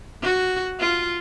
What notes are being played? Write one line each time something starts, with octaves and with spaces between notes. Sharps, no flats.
F#4
F4